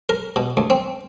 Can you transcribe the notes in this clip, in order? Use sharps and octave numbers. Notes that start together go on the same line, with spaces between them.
A#4
B2
D2
C4